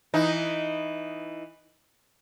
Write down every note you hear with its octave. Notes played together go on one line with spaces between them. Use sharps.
E3 D#4